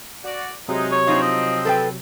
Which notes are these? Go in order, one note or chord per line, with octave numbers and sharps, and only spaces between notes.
F#4 D5
C3 F#3 G#3 D#4
C#5
F3 C4 D#4 F4
D#5
A4 B4 G5